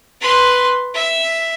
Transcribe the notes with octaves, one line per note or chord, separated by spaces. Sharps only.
B4 C6
E5